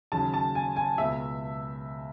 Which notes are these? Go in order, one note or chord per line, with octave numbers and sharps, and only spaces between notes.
D#2 C#3 F#3 C#4 A5
A5
G#5
G#5
C#2 B2 G#3 E5